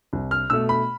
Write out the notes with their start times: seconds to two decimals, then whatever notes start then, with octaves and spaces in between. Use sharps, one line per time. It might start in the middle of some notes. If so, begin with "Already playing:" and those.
0.13 C2
0.31 F6
0.50 B2 A3 E6
0.69 B5